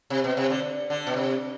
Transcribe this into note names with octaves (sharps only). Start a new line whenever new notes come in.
C3
B2
C3
D3
D3
B2
C3